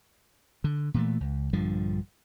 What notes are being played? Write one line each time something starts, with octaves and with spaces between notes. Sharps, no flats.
D3
A#2 E3 A3
C#2
A#1 G2 D3 F3